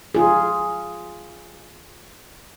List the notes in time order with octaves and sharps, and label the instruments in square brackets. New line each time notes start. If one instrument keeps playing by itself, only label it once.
[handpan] F4 G#4